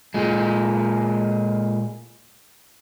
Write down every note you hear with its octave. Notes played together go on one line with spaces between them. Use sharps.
A#2 G#3